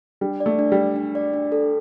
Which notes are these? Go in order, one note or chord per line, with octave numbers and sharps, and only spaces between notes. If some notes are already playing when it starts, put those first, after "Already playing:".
G3 D4
D5
A3
D4
G3
D4
D4
D5
D4
A4